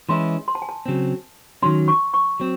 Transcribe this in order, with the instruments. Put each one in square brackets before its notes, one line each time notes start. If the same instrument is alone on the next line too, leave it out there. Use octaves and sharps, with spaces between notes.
[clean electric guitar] E3 G#3 C#4 E4 [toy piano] C6
[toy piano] C6
A5
G#5
A5
[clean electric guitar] C#3 F#3 C4
[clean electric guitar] D#3 F#3 C#4 [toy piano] C6
[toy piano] C#6
C#6
[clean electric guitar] F#3 C4